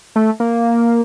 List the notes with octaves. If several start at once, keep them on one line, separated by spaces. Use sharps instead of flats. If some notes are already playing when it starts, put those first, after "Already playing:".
A3
A#3